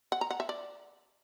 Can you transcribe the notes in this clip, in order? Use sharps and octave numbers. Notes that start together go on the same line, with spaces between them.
F#5
A#5
F#5
E5
D5